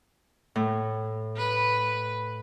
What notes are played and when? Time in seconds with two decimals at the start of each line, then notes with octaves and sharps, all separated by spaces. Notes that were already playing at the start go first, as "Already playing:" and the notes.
0.56 A2
1.37 B4